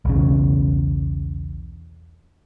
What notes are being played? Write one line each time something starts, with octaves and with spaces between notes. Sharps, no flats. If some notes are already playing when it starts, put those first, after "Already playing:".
B1 E2 C#3